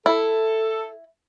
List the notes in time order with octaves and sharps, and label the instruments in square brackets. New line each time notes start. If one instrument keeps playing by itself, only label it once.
[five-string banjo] E4 [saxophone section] A4